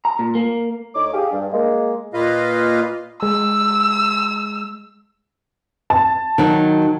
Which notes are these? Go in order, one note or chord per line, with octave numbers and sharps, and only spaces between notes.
A#5
A#2
A#3
D2 D#4 C#5 D6
G4 G#4 F5
G2
G#3 A#3
A#2 A#3 F4 B4 D#5 F5
G#3 E6
A5
D#3 F#3 D#4